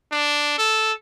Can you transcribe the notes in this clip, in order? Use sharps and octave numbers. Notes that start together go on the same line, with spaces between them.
D4
A4